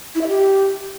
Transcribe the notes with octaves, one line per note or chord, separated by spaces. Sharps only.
E4
E5
G4